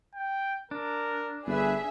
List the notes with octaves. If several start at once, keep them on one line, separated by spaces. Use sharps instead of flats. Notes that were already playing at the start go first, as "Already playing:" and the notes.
G5
D4 A#4
G1 G#4 B4 E5